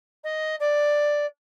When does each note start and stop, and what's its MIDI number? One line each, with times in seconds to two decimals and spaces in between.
0.24 0.56 75
0.60 1.26 74